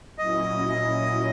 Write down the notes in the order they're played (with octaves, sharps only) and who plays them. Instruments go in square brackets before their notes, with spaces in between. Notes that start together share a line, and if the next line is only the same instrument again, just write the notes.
[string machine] A#2 F#3 C#4 E4 [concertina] D#5